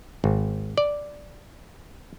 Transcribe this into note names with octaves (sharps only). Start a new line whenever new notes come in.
G#1
D5